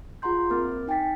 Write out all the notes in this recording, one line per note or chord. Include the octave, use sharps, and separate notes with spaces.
F4 G#4 F#5 A#5 C6 G6
A#3 C4 A#4 D6 F6 A6
D#4 G5 G#5 A6 B6